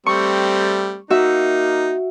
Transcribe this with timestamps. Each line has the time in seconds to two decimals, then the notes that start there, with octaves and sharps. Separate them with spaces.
0.06 G3 A3 C4 C#6
1.10 A#3 D#4 F#4 E5